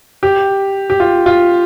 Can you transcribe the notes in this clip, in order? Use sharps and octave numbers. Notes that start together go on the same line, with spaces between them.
G4
G4
F4
F4